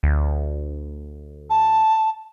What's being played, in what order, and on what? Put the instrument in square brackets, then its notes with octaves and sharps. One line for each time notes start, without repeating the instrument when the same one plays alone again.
[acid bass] D2
[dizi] A5